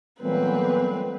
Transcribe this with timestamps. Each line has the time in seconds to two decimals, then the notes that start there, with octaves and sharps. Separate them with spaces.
0.21 A#2 E3 F#3 G3 A3 B3 C4 B4